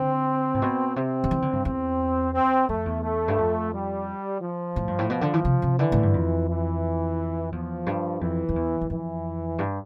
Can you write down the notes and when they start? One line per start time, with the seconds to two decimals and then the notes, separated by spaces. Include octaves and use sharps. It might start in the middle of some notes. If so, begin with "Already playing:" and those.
Already playing: D3 C4
0.54 A2
0.62 B2
0.96 C3 C4
1.24 D3
1.31 E3
1.42 D3
1.53 G2
1.65 E2 C4
2.34 C4
2.69 F2 A3
2.86 E2
3.03 A3
3.28 G2
3.38 F2
3.72 G3
4.41 F3
4.76 A2
4.88 G2
4.99 A2
5.10 B2 F3
5.21 D3
5.34 E3
5.45 C3
5.62 C3
5.79 D3 E3
5.92 A2
6.03 G2
6.14 F2
6.48 E3
7.52 E2 F3
7.87 G2
8.21 F2 E3
8.49 F2
8.56 E2
8.81 E2
8.90 F2 E3
9.59 G2